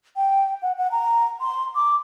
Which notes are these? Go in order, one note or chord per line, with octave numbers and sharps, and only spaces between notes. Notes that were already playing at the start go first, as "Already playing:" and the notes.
G5
F#5
F#5
A#5
C6
D6